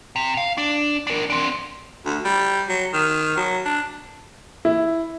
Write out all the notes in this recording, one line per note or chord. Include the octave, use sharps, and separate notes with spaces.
C3
F5
D4
D4 A#4
C4 D4
D2
G3
F#3
D#3
F#3
D4
E4